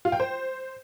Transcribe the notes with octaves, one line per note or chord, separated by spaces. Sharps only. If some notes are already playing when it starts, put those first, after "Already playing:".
F4
G5
C5